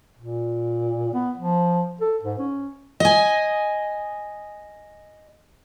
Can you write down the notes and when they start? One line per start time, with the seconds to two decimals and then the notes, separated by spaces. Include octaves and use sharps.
0.17 A#2
1.14 B3
1.37 F3
2.01 A4
2.23 G#2
2.38 C#4
3.00 D#5 G#5